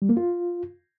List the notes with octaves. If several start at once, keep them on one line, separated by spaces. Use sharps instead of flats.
G3
A#3
F4